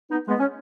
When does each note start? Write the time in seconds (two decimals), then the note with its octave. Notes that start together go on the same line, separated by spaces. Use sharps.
0.11 B3 D#4
0.28 G#3 B3
0.39 C#4